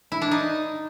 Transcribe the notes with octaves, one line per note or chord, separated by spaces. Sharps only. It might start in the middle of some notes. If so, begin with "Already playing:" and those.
E4
D4
D#4